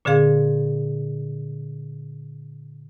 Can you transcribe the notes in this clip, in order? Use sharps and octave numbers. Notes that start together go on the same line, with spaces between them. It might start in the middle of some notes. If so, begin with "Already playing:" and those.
A#2 D3 C4 G#4 F5